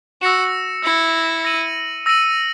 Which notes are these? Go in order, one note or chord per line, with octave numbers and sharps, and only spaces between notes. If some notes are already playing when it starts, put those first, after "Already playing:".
F#4 E6 A#6 C#7 E7
E4 E6 A#6 C#7 E7
E6 A#6 D#7 F#7
E6 A#6 D#7 F#7